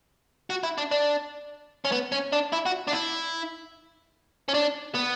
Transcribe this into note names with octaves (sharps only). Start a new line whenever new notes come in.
F#4
E4
D4
D4
C#4
B3
C#4
D4
E4
F#4
D4
E4
C#4
D4
B3